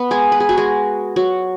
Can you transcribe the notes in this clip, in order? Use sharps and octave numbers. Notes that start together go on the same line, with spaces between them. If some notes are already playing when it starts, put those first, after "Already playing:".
Already playing: B3 B4
G#3 G#4
B4
G#4
F#4
G#3 G#4
F#3 F#4